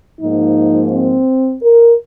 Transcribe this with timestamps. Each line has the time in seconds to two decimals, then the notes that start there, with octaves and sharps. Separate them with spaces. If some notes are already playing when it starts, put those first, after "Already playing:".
0.20 G#2 F3 A#3 D#4
0.92 C4
1.62 A#4